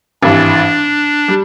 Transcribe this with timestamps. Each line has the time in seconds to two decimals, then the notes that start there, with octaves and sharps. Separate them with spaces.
0.23 G#1 G2 E3 D4
1.28 G3